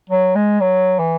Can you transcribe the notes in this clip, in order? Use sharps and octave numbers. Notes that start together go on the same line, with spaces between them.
F#3
G#3
F#3
E3